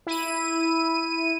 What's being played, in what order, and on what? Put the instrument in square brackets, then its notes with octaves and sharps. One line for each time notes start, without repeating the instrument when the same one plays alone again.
[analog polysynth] E4 D#7